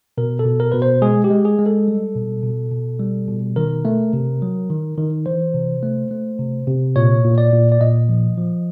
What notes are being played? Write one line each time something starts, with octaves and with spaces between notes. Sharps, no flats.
B2 A#4
A4
B2
A#4
B2 B4
C5
G#3 G#4
G4
G#3
G#4
G#3
A4
G3
B2
B2
B2
G3
B2
D#3 A#4
A3
C3
F#3
D#3
D#3
E3 C5
C3
A3
A3
C3
C3
A#2 C#5
A#2
D5
A#2
D5
A#2 D#5
F3
F3